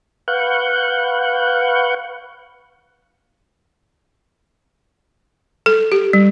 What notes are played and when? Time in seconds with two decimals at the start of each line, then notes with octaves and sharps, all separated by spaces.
0.28 B4 F5 F#5 C#6 F#6 G6
5.66 A4
5.92 G4
6.13 G3